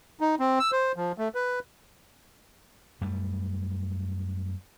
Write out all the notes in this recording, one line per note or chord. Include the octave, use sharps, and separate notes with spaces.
D#4
C4
E6
C5
F3
A3
B4
F#2 G3 A3